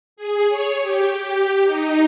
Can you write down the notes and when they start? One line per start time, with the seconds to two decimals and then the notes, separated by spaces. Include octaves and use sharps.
0.17 G#4
0.49 C#5
0.81 G4
1.13 G4
1.64 D#4